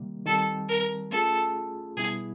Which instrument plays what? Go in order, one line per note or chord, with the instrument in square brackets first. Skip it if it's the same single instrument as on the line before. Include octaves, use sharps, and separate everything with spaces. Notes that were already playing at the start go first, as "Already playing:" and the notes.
Already playing: [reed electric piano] C3 D#3 G3 A#3
[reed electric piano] D#3 G3 C4 [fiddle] A4
[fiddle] A#4
[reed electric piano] A3 C#4 F4 G#4 [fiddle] A4
[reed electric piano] B2 G3 B3 E4 [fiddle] G#4